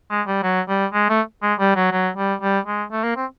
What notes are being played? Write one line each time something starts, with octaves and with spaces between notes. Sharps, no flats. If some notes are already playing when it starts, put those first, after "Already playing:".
G#3
G3
F#3
G3
G#3
A3
G#3
G3
F#3
F#3
G3
G3
G#3
A3
A#3
C4